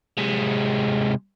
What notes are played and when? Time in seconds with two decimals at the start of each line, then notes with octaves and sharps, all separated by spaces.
0.17 C3 G#3